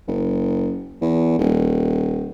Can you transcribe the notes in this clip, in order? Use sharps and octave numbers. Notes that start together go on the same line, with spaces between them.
F#1
E2
D#1